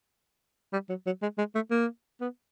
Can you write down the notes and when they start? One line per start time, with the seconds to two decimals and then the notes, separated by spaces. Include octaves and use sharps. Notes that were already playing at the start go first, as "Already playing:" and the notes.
0.73 G3
0.89 F#3
1.06 F#3
1.22 G#3
1.38 G#3
1.55 A3
1.71 A#3
2.21 B3